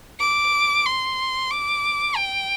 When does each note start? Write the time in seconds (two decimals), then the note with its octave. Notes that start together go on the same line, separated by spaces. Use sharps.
0.20 D6
0.86 C6
1.51 D6
2.17 G5